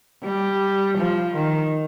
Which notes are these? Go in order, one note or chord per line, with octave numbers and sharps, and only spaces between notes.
G3
F3
D#3